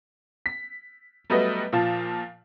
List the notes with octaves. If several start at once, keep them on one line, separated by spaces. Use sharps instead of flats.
B6
F#3 G3 A3 B3 B4 D#5
A#2 F3 F4 A5